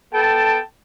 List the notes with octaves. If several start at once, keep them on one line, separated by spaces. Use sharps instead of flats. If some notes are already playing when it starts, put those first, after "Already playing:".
B3 A4 G5 A5